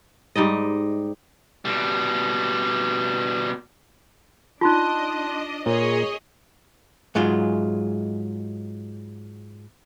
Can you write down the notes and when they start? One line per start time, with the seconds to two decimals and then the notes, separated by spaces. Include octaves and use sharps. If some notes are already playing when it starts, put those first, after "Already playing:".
0.36 G#2 G3 D#4 D#5
1.65 B2 G3
4.61 D4 D#4 F4 D#5 A5 C6 F#6
5.66 A#2 G#4 A#4 C#5 D#5
7.15 G#2 F#3 G#3 F4